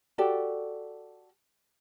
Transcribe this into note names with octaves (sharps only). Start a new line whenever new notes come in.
F#4 G4 A4 D5